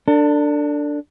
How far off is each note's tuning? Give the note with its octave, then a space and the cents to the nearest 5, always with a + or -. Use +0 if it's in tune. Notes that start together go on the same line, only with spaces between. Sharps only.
D4 +0 A4 +40